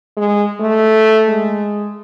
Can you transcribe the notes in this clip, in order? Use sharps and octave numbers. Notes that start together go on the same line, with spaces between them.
G#3
A3
G#3